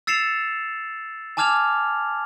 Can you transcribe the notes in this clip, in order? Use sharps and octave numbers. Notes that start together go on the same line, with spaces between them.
E6 A6 C7 C#7 E7 F7
G#5 A5 D6 F6 G#6 F7